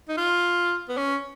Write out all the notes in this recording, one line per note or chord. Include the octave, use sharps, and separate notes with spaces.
D#4
F4
B3
C#4